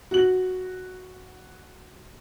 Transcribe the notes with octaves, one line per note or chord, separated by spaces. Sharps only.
F#4 F#7